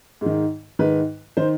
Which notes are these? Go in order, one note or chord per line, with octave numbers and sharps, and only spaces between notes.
G#2 D#3
G#2 D#3 B4
D#3 C5